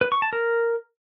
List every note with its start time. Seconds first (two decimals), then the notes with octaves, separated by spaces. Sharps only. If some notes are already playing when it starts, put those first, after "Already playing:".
0.01 B4
0.12 C#6
0.22 A5
0.33 A#4